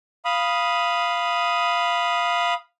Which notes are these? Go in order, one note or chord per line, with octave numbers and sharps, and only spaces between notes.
F5 B5 D#6